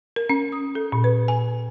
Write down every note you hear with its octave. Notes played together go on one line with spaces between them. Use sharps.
A#4
C#4
D#6
A4
A#2
B4
G#5